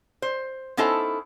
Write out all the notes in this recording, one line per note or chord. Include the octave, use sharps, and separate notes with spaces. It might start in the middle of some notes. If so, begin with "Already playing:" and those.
C5
B3 C#4 D#4 E4 A4 C5